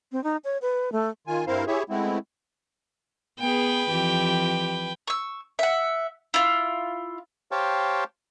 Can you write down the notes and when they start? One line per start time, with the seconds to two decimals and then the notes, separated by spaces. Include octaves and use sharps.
0.12 C4
0.24 D#4
0.44 C#5
0.62 B4
0.92 A3
1.27 D#3 F4 G#5
1.47 G2 C4 E4 A#4 C5 F5
1.67 E4 G4 G#4 C#5 E5
1.89 G#3 A3 B3 C4 E4
3.39 B3 G#4 B4 G5
3.90 F2 E3 G4
5.08 C#6 E6
5.59 E5 F#5
6.34 E4 F4
7.52 G4 C5 C#5 F5 G5 A5